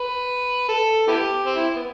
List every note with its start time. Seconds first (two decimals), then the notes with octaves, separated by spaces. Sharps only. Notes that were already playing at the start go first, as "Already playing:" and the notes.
Already playing: B4
0.69 A4
1.08 B3 E4 G4
1.46 C4
1.56 E4
1.76 B3